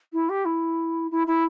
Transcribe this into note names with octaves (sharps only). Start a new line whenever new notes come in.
E4
G4
E4
E4
E4